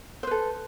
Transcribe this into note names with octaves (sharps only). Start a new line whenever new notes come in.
A4 B4 C5